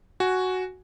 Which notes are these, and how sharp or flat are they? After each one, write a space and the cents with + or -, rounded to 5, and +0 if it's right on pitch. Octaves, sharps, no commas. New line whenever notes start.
F#4 +0 G#5 +0